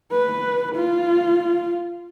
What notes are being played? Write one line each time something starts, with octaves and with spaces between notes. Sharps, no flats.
B4
F4